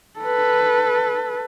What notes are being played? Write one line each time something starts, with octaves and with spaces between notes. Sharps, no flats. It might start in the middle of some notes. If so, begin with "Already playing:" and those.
A4 B4